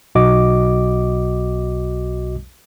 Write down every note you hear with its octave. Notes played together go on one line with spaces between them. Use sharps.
B1 F#4 D#5 D6